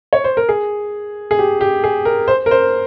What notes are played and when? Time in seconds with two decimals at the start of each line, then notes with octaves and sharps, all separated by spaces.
0.13 C#5
0.24 C5
0.37 A#4
0.49 G#4
1.31 G#4
1.39 G4
1.61 G4
1.84 G#4
2.05 A#4
2.28 C5
2.46 A#4
2.51 C5